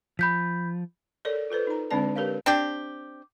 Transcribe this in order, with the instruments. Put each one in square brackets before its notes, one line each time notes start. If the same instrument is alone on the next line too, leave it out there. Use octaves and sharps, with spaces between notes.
[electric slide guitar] F3 [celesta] B5 G6 B6
[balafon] A4 A#4 C#5 D5
F4 A4 B4 C5
D#4 A#5
D3 G#3 C4 D4 D5 A5
G4 A#4 B4 C#5 F5
[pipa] C4 D4 G4